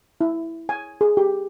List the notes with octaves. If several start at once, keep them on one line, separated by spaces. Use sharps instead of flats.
E4
G#5
G#4
G4